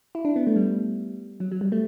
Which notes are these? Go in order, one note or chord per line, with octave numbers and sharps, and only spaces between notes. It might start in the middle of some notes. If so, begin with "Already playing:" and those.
E4
D4
B3
A3
G3
F#3
F#3
G3
A3